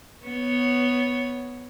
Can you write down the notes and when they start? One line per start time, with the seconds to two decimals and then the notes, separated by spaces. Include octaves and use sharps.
0.25 B3 C#5